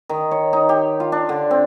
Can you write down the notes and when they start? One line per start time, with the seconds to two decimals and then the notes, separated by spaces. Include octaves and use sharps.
0.09 D#3
0.31 C#5
0.53 D#4
0.69 G4
1.00 F4
1.12 D4
1.29 D3
1.51 C4